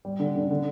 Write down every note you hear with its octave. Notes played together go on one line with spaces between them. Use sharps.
G3
D3
D3
D3